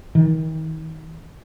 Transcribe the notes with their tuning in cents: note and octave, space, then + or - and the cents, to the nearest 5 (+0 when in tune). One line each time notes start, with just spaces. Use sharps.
D#3 +35